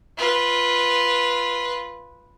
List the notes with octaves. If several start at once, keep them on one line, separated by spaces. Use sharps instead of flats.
F4 B4